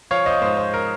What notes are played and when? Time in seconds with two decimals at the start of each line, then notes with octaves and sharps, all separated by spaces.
0.11 F3 C#5 F5
0.26 C5 D#5
0.41 G#2 C5
0.57 C5
0.74 A#4